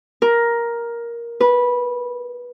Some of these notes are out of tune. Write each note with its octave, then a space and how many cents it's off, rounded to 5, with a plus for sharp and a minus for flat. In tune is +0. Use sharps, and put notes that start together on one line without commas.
A#4 +10
B4 -15